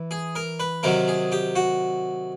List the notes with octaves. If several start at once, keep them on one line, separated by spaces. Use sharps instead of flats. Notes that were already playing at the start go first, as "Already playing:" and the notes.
Already playing: E3
G#4
A#4
B4
C3 D#3 F#3 A#4
G#4
G4
F#4